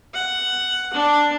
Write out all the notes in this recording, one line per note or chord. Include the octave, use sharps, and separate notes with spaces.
F#5
D4